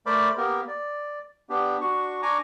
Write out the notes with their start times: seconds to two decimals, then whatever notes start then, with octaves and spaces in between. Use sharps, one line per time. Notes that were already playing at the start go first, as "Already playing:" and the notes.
0.06 A3 A#4 C5 D5 B5 D6
0.37 A#3 B3 G4 A#4
0.68 D5
1.50 B3 D4 G4
1.81 D4 F#4 C#6
2.22 D4 G#5 A#5 C#6 D6